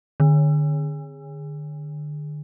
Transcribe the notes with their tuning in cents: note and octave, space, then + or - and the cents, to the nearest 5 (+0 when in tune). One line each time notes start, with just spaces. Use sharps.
D3 +30